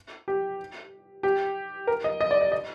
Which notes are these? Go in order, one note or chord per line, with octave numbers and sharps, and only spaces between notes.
G4
G4
A#4
D#5
D#5
D5
D#5
D#5